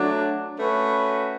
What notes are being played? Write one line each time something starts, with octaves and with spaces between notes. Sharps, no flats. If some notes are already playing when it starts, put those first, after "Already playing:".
Already playing: F#3 A3 D4
A3 C#4 F#4 B4